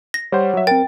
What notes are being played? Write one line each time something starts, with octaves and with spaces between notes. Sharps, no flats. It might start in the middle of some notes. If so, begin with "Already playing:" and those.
A#6
G3 C5 C#5 F#5
F#3 E5
C4 A#4 G5 A6